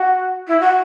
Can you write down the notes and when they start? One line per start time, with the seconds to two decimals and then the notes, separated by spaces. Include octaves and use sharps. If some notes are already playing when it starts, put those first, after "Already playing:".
Already playing: F#4
0.48 E4
0.60 F#4